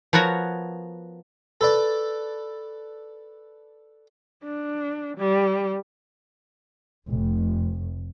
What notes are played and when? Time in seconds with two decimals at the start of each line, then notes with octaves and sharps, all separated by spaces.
0.13 F3 B3 F#4 A#4 C#5
1.61 A4 B4 D5
4.44 D4
5.18 G3
7.10 F1